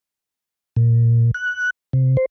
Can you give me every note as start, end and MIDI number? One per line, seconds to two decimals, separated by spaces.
0.76 1.31 46
1.34 1.70 90
1.93 2.17 48
2.17 2.25 72